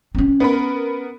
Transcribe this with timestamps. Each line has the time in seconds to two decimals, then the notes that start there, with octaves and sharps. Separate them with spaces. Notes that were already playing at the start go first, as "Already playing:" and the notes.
0.15 C4 C#4
0.40 B3 A#4 B5